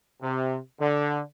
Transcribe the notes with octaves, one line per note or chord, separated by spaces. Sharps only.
C3
D3